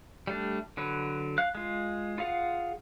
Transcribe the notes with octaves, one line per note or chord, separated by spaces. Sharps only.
G3 A3 D4
D3 F#3 B4
F5 F#6
G#3 F4
F4 G#4 F5 F#5